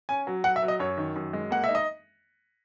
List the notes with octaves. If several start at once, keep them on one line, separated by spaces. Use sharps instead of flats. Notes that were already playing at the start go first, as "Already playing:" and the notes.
C#4 G#5
F#3
F#3 F#5
E5
F#3
D#5
F#2 C#5
D#3
F#2
G#3
A#3 F#5
D#4 E5
D#5